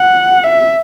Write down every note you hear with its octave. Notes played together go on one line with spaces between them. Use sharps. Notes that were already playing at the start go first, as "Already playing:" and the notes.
Already playing: F#5
E5